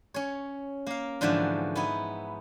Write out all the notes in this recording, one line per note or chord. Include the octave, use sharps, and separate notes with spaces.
C#4 C#5
A#3 F5
G#2 D3 E3 F3 F#4 E5
B3 D#4 E4